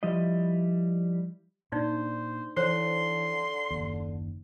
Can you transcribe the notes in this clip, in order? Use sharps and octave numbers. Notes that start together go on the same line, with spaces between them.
F3 G3 E4 D#5
A#2 D4 D#4 C5 D5
D3 E3 C5 C#5 C6
F#1 D#2